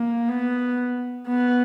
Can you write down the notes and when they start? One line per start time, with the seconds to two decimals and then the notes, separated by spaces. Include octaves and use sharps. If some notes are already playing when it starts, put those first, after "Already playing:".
Already playing: A#3
0.29 B3
1.28 B3